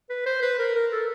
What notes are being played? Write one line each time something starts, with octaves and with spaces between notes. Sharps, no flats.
B4
C5
B4
A#4
A#4
A4